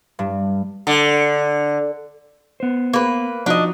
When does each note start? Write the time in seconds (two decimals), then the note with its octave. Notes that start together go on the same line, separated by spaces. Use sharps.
0.19 G2
0.87 D3
2.60 B3 C5
2.93 A#3 B4
3.46 F3 D4 D#4 F#4 D#5